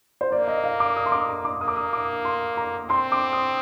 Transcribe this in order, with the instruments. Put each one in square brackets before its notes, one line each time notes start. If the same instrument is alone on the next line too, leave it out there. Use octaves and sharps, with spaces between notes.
[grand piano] C5
[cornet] A#3 [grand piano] D5
[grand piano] D#5
F5
D6
D#6
C6
D6
A#5
D6
[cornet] A#3 [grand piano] D#6
[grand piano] D6
D#6
D6
C6
A#5
[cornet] C4 [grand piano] C6
[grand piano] D6
D#6